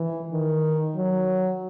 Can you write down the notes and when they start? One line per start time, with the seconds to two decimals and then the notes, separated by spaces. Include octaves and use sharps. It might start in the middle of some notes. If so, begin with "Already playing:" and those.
Already playing: E3
0.32 D#3
0.95 F#3